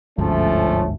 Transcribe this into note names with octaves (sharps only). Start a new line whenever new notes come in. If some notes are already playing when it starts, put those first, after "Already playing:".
G1 D2 G#2 F3 A3 C#4